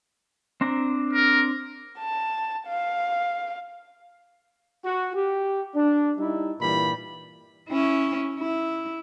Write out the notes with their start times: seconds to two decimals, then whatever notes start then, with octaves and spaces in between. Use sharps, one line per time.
0.61 C4 D4 A#5
1.13 A#4
1.99 A5
2.68 F5
4.84 F#4
5.14 G4
5.75 D4
6.18 G3 D#4 E4
6.59 G2 A#2 E3 G3 B5
7.69 C#4 E4
8.39 E4